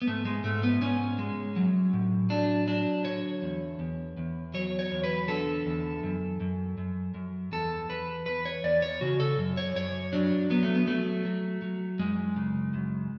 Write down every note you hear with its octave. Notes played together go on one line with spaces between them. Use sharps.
B3
G#2 A3
G#3
G#2 A3
B3
G#2 C#4
G#3
F#3
A2
F#3 D4
F#3 D4
D3 C#5
E2
E2
E2
F#3 C#5
C#5
E2
B4
D3 A4
E2
F#2
F#2
F#2
F#2
E2 A4
E2 B4
E2 B4
C#5
E2 D5
C#5
C#3 F#4
A4
F#2
C#5
F#2 C#5
F#3 D4
F#3 B3
A3
B3
F#3 A3
F#3
F#3
F#2 G#3
C#3
F#2